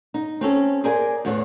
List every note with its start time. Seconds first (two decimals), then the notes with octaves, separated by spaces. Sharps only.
0.14 D#4
0.41 C4 C#4 A4
0.84 G#4 A#4 C5 D5 G#5
1.25 E2 A2 E3